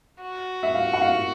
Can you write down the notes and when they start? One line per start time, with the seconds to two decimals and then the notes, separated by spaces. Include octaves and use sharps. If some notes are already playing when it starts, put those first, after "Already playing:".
0.22 F#4
0.63 E5
0.75 F5
0.93 F#5
1.02 F5